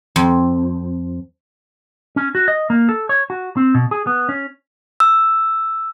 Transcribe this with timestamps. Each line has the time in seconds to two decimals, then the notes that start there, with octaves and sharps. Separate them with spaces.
0.16 F2
2.16 C#4
2.35 F#4
2.48 D#5
2.70 A#3
2.89 A4
3.09 C#5
3.30 F#4
3.57 C4
3.75 B2
3.91 G#4
4.07 B3
4.29 C#4
5.00 E6